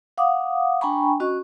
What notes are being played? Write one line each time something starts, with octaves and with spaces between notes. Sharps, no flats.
F5 F#5 D6 D#6
D4 G5 G#5 A#5 B5 C#6
C#4 F#4 D#5 C#6